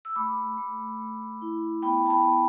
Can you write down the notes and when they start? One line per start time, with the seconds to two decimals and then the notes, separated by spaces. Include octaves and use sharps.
0.05 E6
0.16 A3 B5 D6
0.57 A3
1.00 A3
1.42 E4
1.83 B3 G5 B5
2.06 A5
2.10 G5 B5
2.25 B3